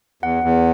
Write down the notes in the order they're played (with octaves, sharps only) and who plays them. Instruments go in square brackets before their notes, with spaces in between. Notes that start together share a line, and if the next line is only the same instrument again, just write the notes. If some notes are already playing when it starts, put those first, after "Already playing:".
[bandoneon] E2 [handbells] F#5
[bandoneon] E2